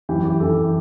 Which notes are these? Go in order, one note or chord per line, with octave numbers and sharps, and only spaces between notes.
F#2 E3 G4
G4
F#2 E3 A4